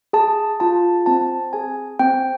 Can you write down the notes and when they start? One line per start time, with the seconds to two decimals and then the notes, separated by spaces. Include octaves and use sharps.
0.13 G#4 A5
0.60 F4 A5
1.06 C4 A5
1.53 G#4 G#5
1.99 C4 G5